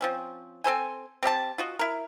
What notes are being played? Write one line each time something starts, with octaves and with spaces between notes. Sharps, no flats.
F3 C4 C#4
C4 A4 C5 G#5
C4 G4 E5 A5
F4 F#4 D#5
E4 A#4